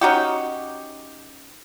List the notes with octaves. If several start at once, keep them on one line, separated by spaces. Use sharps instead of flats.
C#4 D#4 F#4 G4